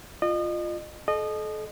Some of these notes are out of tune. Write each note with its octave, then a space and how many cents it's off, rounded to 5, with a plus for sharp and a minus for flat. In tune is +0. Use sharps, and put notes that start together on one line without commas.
F4 +0 D#5 -35
A4 -35 D#5 -25